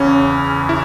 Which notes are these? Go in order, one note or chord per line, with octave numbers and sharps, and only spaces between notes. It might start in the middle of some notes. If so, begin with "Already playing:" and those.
Already playing: E2 C#3 E3 C#4
E4